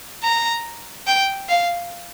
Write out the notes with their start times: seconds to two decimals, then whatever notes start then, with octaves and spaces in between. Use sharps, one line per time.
0.23 A#5
1.07 G5
1.49 F5